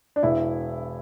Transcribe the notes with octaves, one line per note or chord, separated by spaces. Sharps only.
D4
E1 E4